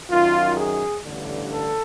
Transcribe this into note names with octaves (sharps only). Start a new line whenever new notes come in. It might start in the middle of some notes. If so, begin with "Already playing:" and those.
F#2 D#3 F4
G#4
A1 G2 D3
A4